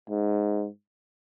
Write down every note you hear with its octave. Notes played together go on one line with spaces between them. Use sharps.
G#2